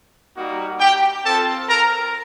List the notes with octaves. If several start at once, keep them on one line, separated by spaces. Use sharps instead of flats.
G3 A#3 D#4 F#4
G4 G5
C4 F4 A4 A5
A#4 A#5